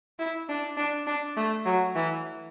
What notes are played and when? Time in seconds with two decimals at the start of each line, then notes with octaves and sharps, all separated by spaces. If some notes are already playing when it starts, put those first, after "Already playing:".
0.19 E4
0.49 D4
0.77 D4
1.07 D4
1.36 A3
1.66 F#3
1.95 E3